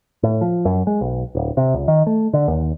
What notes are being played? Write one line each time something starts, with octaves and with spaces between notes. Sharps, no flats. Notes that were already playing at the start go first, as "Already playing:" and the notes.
A2
F3
F#2
G#3
B1
D1
C3
C#2
D#3
A3
D3
D#2